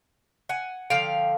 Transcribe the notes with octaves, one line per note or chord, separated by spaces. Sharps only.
F#5 G#5
D3 F3 F5 G5